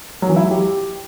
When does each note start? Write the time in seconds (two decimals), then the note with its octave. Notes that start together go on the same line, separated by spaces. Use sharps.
0.22 F#3
0.29 E3
0.36 E4
0.43 F#3
0.50 G4